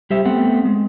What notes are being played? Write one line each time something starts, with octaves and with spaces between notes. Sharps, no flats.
G3 G4 C5 E5
A3 B3 C4 F#5 G5
G#3